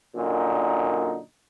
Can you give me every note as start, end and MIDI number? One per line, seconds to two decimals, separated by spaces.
0.16 1.18 42
0.16 1.18 46
0.16 1.18 50
0.16 1.18 63